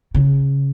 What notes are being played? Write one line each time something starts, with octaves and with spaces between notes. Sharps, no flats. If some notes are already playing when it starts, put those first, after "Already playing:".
C#3